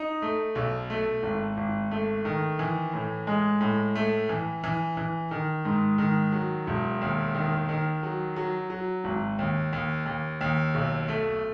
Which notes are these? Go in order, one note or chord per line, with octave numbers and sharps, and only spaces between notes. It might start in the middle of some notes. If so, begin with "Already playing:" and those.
Already playing: D#4
A3
B1
A3
G#1
G#1
A3
D#3
E3
A2
G#3
A2
A3
E3
E3
E3
D#3
G#2
D#3
F#3
E1
D#2
D#3
D#3
F#3
F#3
F#3
G#1
D#2
D#2
D#2
D#2
B1
A3